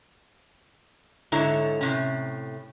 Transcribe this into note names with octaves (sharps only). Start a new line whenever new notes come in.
G#2 D3 E4 A4 C#5 A#5
A2 C3 C#4